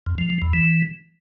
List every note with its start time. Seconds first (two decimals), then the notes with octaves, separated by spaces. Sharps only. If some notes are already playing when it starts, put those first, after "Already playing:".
0.06 F2
0.18 F3
0.30 F3
0.42 E2
0.53 E3